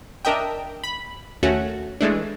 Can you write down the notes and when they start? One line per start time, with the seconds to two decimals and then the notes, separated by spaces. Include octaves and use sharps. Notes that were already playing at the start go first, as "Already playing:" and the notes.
0.25 D4 A#4 D#5 E5 G5
0.84 B5
1.43 D#2 A3 C#4 F#4
2.01 E3 G#3 A3 D4